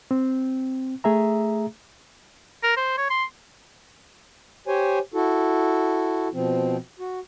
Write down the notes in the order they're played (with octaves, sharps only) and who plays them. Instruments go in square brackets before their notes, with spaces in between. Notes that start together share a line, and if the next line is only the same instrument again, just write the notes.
[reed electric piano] C4
A3 G#4 E5 A#5
[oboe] A#4
C5
C#5
C6
[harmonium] G4 C5 C#5 G#5
E4 F#4 A4
B2 F3 C4
F#4